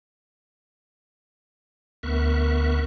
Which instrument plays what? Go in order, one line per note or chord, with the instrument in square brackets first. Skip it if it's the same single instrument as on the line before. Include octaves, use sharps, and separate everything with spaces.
[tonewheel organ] D2 B3 A#4 E5 C#6 F#6